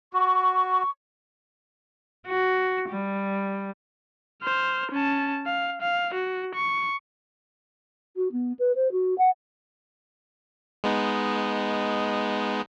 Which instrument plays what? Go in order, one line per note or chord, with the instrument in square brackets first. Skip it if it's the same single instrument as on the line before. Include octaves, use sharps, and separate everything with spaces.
[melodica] F#4 [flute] C#6
[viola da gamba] F#4
G3
[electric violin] C5 F6
C#4 A5
F5
F5
F#4
C#6
[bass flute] F#4
B3
B4
C5
F#4
F#5
[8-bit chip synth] G#3 B3 D#4